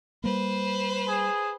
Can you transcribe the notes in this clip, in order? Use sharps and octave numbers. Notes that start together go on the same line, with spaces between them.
G3 A#3 B4 C5
G#4